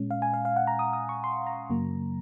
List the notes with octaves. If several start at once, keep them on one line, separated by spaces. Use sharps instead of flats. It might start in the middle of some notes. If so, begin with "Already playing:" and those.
Already playing: A#2 G#3 C#4
F5
G#5
F5
F5
F#5
A#5
D#6
D#6
C#6
C6
A#5
F#2 C#3 F#3 A#3